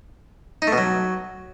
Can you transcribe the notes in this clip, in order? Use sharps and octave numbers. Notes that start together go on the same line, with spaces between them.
D#4
A3
B2
F#3